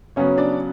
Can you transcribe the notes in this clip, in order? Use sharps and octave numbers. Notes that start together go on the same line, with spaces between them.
C#3 F#3 B3 C#4 C#5
D4 D5